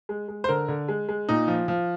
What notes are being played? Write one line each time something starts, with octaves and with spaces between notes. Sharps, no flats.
G#3
G#3
C5
D3 A#4
D3
G#3
G#3
A#2 D#4
F3
F3